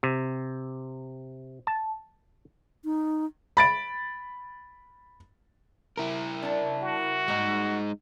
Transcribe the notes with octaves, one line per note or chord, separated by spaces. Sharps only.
C3
A5
D#4
B5 A6 D7
E4 A#4
D4 A5
F#4
G3 G#3 A#3 D#4